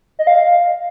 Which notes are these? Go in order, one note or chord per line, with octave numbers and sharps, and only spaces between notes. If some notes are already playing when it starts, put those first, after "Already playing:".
D#5
F5